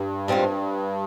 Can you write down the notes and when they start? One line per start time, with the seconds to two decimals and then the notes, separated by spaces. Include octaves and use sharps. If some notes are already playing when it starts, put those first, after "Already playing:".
Already playing: G2
0.28 G#2 G3 C4 F4